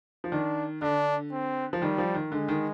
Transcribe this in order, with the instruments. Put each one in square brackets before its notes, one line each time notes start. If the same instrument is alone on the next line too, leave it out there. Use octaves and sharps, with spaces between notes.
[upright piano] F3
[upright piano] D#3 [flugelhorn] D4
[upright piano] D3 [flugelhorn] D4
[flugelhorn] C4
[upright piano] F3
[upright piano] D#3 [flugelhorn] G3
[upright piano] F3
D#3
[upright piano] D3 [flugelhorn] G#3
[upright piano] D#3